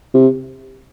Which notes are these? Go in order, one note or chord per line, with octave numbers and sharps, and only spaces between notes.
C3